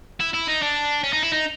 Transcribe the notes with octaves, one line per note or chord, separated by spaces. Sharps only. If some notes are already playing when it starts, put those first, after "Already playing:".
E4
E4
D#4
D4
C#4
D#4
E4
D#4